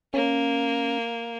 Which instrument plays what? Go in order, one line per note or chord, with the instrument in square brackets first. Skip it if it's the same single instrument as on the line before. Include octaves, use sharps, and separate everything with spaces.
[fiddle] A#3 [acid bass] C#4